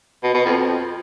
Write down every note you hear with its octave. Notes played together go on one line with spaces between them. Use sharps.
B2
B2
F2